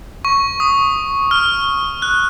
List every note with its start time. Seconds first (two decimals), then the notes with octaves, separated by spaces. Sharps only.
0.25 C#6
0.60 D#6
1.31 F6
2.02 F#6